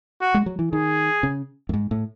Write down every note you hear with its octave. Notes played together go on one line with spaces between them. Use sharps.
F#4
G#3
F#3
E3
D#3 G#4
C#3
F#2
G#2
A2